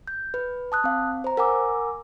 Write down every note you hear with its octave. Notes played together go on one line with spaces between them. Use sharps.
G6
B4
A5 D#6 F#6
C4 F5
C5 A#5
A#4 F#5 G#5 A#5 D6 E6